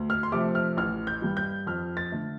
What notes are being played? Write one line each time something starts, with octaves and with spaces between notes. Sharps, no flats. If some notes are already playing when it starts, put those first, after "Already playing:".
Already playing: D2
F6
C6
C3 F3 A3 D6
F6
A1 F6
G6
G2 G3
G6
F2 F6
A6
D3 A3